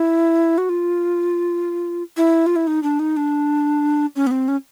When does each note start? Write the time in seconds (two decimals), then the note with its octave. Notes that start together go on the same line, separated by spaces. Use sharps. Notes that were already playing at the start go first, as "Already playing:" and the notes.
Already playing: E4
0.58 F#4
0.69 F4
2.17 E4
2.46 F4
2.56 E4
2.67 D#4
2.83 D4
2.99 D#4
3.17 D4
4.16 C#4
4.27 B3
4.31 C4
4.48 C#4